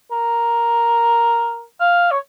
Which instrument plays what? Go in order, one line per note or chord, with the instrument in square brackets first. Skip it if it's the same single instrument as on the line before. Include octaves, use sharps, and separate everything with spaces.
[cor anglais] A#4
F5
C#5